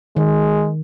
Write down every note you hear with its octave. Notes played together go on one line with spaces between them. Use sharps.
D#3 G#3